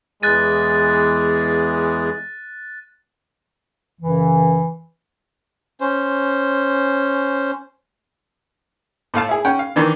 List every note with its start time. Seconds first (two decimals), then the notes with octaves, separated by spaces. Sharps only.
0.23 E2 G#3 F#6 A6 D#7
4.01 F#2 C#3 E3
5.80 C#4 C5
9.14 A2 A3 F5 A5
9.29 E4 G#4
9.45 C#4 F#5 G5
9.59 F5
9.76 D#3 E3 D4